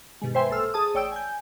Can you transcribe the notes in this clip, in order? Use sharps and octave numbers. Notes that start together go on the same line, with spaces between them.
G2 B2 D#3 G#3
B4 C5 E5 G5 G#5 C6
A#1 A4 C5 E6 F6
G#4 A5 D#6
A1 C#5 D5 G5 E6 D7
G#5 G6